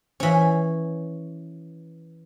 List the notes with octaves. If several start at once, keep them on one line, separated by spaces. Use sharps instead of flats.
E3 C#4